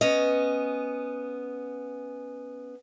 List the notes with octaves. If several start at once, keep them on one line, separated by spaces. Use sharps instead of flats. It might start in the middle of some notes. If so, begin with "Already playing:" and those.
B3 C#4 D#5